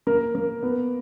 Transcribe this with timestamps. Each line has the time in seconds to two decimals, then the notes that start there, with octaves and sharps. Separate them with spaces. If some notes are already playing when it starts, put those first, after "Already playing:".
0.07 A#3 A#4
0.35 A#3
0.63 B3